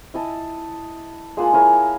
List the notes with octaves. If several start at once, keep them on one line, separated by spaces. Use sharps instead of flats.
E4 D#5 A5
G#3 A#3 F4 F#5
E4 G#4 A#4 C#5